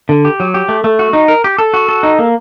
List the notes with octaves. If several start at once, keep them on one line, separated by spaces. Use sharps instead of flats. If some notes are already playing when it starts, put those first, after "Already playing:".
D3
G4
F#3
G4
A3
A3
F#4
D#4
A#4
G4
A4
F#4
A4
D#4
A#3